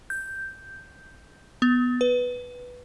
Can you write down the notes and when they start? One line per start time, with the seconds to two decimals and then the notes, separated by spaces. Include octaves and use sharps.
0.10 G6
1.62 B3
2.01 B4